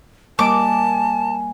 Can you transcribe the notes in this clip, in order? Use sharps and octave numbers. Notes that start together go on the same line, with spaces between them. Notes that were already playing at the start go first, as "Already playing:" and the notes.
G3 A#3 D#5 G#5 A5 D6